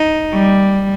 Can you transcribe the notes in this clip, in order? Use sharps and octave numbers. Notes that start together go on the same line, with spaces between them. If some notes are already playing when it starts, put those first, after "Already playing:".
Already playing: D#4
G3